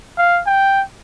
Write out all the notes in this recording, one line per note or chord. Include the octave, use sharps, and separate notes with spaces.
F5
G5